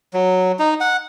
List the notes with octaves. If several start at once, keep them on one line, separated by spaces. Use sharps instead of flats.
F#3
D#4
F#5